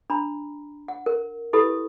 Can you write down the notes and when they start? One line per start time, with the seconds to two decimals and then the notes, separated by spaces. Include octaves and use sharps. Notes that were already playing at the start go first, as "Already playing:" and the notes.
0.10 D4 A#5 B5
0.88 F#5
1.06 A#4
1.53 E4 G4 A4 B4 B5 D#6